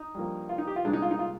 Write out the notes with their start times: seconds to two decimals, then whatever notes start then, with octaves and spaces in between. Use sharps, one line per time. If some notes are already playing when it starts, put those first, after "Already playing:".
Already playing: D#4
0.15 G2 F3 A#3
0.49 F4
0.58 D#4
0.67 G4
0.76 F4
0.85 C2 A#2 G#3 D4
0.93 D#4
1.02 F4
1.11 D#4
1.19 F4